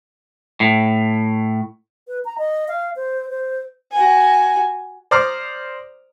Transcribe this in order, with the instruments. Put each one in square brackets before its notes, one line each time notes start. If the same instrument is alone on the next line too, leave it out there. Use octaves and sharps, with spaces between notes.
[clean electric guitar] A2
[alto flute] B4
A#5
D#5
F5
C5
C5
[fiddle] F#4 G#5
[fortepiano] C5 D5 A#5 D6 D#6 F6